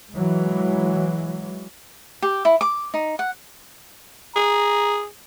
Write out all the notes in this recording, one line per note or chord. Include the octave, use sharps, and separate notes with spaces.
E3 F#3 G#3
G4
E4
D6
D#4
F#5
G#4 A#5